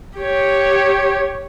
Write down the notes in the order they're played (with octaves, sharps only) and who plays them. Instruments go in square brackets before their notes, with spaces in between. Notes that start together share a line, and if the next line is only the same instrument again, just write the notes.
[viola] G4 C#5